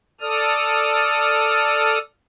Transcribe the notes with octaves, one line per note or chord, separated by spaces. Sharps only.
A4 D5 D#6 F6